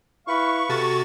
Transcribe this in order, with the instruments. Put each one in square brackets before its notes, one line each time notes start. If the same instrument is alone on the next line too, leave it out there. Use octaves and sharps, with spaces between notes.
[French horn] E4 [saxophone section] B4 F5 [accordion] C#6
[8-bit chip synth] C3 F#4 A6 [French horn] A4